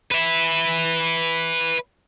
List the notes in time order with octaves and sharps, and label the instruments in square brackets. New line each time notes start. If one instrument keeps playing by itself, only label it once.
[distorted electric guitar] B4 E5